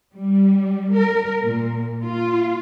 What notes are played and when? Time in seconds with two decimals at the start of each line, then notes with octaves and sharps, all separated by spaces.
0.13 G3
0.95 A#4
1.44 A#2
2.04 F4